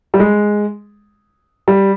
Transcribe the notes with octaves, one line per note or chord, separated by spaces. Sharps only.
G3
G#3
G3